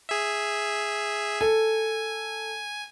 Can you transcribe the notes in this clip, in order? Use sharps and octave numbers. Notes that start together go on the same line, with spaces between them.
G#4 E5
A4 G#5